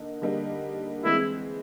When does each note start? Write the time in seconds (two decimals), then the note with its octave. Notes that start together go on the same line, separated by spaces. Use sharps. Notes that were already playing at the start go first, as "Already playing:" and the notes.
Already playing: D3 A#3 D#4
0.22 D3 G3 A#3 D#4
1.05 E3 G#3 C4 E4